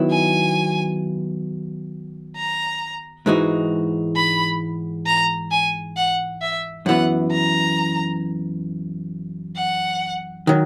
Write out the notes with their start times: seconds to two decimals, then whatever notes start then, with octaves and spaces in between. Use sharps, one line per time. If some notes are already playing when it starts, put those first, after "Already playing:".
Already playing: D#3 F#3 B3 E4
0.11 G#5
2.36 A#5
3.26 G#2 E3 G#3 D#4 F#4
4.16 B5
5.06 A#5
5.51 G#5
5.96 F#5
6.41 E5
6.86 F#2 E3 B3 F#5
7.31 A#5
9.56 F#5
10.47 D#3 F#3